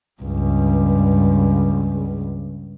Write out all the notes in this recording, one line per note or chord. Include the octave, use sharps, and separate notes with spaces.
C#2 G2